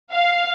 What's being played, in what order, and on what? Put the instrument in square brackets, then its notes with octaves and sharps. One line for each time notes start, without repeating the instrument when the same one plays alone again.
[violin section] F5